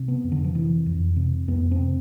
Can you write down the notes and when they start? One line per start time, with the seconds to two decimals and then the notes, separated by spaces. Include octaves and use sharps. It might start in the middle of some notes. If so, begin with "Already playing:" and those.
Already playing: C3
0.08 B3
0.24 F2
0.32 D3
0.44 F3
0.55 C3 E3
0.86 F2
1.16 C3
1.48 F2 B3
1.71 C4
1.79 C3